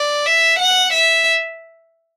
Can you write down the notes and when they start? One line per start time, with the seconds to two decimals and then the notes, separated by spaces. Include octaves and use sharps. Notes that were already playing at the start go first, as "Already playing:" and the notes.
Already playing: D5
0.26 E5
0.59 F#5
0.93 E5